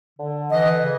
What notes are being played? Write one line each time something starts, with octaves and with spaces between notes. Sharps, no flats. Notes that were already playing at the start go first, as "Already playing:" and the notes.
D3
E3 D#5
C#3